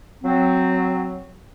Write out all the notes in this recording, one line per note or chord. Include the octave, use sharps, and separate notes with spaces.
F#3 C4